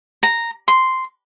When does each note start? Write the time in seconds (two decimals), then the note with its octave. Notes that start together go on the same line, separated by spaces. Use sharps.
0.23 A#5
0.68 C6